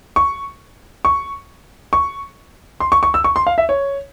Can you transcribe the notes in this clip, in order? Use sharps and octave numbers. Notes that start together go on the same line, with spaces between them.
C#6
C#6
C#6
C6
C#6
C#6
E6
C#6
C6
F5
E5
C#5